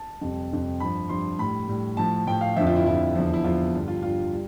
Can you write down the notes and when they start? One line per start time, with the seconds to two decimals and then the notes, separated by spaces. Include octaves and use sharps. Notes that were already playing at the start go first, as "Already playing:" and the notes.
Already playing: A5
0.21 F2 C3 G3
0.51 F2 C3 G3
0.80 G2 F3 B5
1.09 G2 F3 C6
1.39 A2 G3 B5
1.68 A2 G3
1.97 A2 F3 A5
2.27 A2 F3 G5
2.41 F5
2.56 F2 D3 F3 E5
2.67 F4
2.76 E4
2.86 F2 D3 F3 E4
3.15 E2 D3 F3
3.33 E4
3.44 E2 D3 F3 F4
3.74 G2 D3 G3
3.88 F4
4.03 G2 D3 G3 F4
4.32 G3